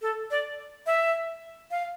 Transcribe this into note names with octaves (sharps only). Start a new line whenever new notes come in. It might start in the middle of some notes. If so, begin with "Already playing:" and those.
A4
D5
E5
F5